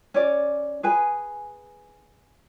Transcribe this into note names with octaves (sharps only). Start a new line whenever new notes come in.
C#4 D5
G#4 B4 G#5